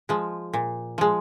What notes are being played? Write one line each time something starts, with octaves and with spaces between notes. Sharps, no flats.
F3 G#3
A#2
F3 G#3